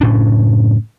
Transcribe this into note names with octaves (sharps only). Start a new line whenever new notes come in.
F#1 A2 C#4 D4